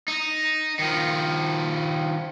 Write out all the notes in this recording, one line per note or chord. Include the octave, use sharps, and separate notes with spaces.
D#4
D#3 F3